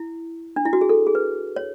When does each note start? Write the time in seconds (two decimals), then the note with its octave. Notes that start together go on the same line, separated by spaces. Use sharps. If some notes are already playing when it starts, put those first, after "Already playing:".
Already playing: E4
0.56 D4
0.65 E4
0.73 F#4
0.81 G#4
0.89 A4
1.07 G#4
1.15 B4
1.56 C#5